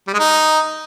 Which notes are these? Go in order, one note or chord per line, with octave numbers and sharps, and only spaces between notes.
G3
G#3
D#4